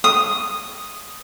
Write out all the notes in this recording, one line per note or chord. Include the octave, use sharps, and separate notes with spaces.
D#6